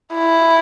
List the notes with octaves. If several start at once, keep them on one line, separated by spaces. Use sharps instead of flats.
E4